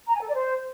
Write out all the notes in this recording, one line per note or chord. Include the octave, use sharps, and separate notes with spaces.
A#5
G#5
A4
D5
C5